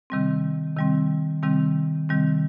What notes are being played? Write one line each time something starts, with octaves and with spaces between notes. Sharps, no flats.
C3 D#3 G3 C4
C3 D#3 G3 C4
C3 D#3 G3 C4
C3 D#3 G3 C4